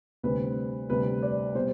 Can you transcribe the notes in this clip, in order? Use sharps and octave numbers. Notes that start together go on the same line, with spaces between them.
D2 C3 G3 C4 B4
D2 C3 G3 C4 B4
D5
B2 G3 C4 C5